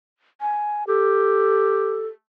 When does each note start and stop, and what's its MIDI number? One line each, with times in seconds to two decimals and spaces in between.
0.41 0.84 80
0.87 2.11 67
0.87 2.07 69